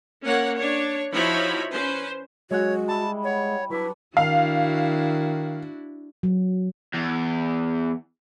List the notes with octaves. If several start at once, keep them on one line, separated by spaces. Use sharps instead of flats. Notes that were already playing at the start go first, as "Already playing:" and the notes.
A#3 C#4 C#5 F#5
D4 C#5
F3 D#4 E4 F#4 C#5 B5
C#4 B4 C5
F#3 G#3 C#4 F#4 C#5 F#5
G3 E4 A5
C#5 F#5
F#3 G3 D4 E4 B4
D#3 D4 E4 F#4 F5
F#3
E2